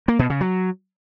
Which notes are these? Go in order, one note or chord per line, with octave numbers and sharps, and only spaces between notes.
A#3
B2
C#3
F#3